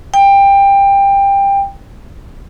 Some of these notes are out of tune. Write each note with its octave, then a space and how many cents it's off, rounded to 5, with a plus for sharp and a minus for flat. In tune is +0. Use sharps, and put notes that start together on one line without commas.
G5 +20